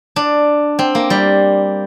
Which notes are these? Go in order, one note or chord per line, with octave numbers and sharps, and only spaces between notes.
D4
C4
A#3
G3